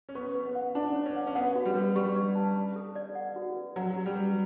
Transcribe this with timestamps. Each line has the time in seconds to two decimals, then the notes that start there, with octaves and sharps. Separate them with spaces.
0.09 C#4
0.15 B3 C#6
0.35 B4
0.45 B3
0.55 F#5
0.75 D4 A5
0.95 C#5
1.06 C#4
1.16 F#5
1.27 C#4
1.35 B3 F#5
1.55 F#4
1.65 G3
1.76 B4
1.96 G3 C#6
2.15 D5
2.36 A5
2.56 A5
2.76 A4
2.95 D5
3.15 F#5
3.36 F#4
3.56 B4
3.76 F#3 F#5
3.96 G4
4.06 G3
4.15 B4